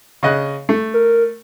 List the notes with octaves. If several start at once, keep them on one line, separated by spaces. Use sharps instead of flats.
C#3 D#5 F#6
A3
A#4